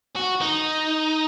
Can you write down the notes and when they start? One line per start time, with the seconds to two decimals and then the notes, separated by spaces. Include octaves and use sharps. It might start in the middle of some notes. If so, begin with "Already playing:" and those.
0.16 F#4
0.41 D#4